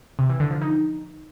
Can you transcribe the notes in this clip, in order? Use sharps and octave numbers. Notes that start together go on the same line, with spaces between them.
C3
E3
D3
F3
D#4